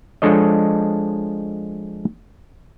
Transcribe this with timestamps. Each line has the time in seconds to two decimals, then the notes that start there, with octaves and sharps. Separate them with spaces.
0.22 F3 G#3 D4 A4 C#5 D#5